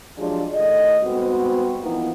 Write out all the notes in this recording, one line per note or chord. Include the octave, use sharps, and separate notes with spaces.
F3 F#3 G#3 D4 G4 G#4
A2 D#3 A4 D#5
G#2 G3 B3 C4 F#4
E3 F3 A#3 B3 D#4 E4